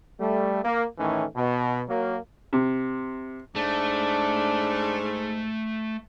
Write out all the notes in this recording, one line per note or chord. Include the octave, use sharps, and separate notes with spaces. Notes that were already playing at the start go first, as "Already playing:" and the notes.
G3 A3
A#3
A2 D#3 E3 A3 C#4
B2
F#3 A#3
C3
G#2 A3 D4